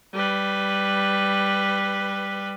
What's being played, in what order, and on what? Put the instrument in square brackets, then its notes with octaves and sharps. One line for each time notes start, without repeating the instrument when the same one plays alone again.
[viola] G3 B4